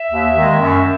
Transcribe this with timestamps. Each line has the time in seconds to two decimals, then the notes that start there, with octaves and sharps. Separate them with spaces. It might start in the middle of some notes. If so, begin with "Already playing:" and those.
Already playing: E5
0.10 D#2
0.35 D#3 G#3
0.59 F#2